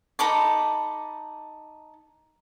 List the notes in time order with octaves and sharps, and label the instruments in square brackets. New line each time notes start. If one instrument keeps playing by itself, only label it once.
[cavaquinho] D#4 A4 B5 D6